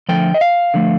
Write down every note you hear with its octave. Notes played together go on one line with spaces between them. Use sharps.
D3 F3 A3 G5
D#5
F5
D3 F3 A3